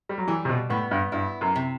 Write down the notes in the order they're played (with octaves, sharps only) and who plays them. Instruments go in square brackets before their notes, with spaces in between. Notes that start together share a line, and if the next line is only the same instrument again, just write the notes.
[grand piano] G3
F#3
[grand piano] E3 [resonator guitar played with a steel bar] G3
[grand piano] C3
B2
[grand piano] A2 [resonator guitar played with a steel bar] B3
[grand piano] G2
[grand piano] G2 [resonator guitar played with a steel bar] E4
[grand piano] F#2
[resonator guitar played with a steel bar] C3